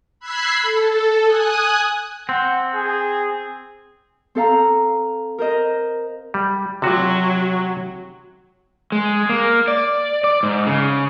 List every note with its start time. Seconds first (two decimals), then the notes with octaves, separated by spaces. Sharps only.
0.20 B5 E6 F#6 G#6 B6 C7
0.62 A4
1.23 G#5 D#6 F#6
2.29 C4 F#5
2.75 G#4
4.35 C4 A4 F5 A#5
5.38 A#4 C5 D#5
6.34 G3
6.82 C3 F#3 F#4
8.92 G#3
9.29 A#3
9.68 D5
10.24 D5
10.43 G#2
10.66 C#3